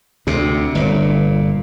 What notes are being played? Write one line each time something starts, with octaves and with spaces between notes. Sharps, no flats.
D2 C3
G1 A#2